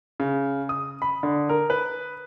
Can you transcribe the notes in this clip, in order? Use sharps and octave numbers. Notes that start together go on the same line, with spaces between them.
C#3
D#6
B5
D3
A#4
B4